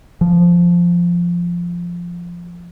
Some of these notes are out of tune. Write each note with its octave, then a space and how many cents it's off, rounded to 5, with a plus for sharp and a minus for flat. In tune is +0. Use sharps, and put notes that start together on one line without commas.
F3 -5